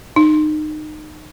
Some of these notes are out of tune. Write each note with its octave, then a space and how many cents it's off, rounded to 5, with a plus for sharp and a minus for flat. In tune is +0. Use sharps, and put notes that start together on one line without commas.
D#4 -25